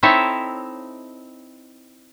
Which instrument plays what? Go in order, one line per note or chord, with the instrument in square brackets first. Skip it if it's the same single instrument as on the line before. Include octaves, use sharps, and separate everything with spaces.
[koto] C4 D#4 E4 A4 C#5 E5